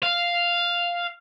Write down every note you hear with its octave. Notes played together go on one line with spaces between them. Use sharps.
F5